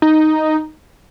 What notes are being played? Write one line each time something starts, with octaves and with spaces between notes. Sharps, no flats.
D#4